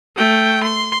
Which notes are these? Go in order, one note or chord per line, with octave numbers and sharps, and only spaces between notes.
A3 G5
C6